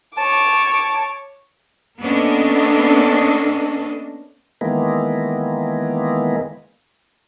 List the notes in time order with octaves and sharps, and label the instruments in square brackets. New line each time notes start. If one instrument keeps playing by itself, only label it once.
[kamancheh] C#5 D6 [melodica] A5
[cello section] A#3 B3 C#4 D4 A4 D#5
[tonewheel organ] D#3 E3 G#3 A#3 B3